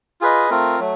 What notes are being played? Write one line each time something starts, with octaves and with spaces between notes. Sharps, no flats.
F4 G#4 B4 D#5
A3 C4 F4 A#4
F#3 A3